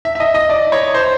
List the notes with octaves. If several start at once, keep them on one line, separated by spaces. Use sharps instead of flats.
E5
E5
D#5
D#5
D5
C#5
C5